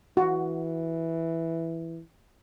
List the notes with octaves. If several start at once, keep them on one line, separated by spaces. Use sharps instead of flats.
E3 F#4